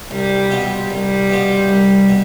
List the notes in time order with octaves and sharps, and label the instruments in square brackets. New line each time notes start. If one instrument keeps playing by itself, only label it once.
[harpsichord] C2 [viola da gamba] G3
[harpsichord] B2 B3 F4
[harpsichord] C2 [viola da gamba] G3
[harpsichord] B2 B3 F4
C2
B2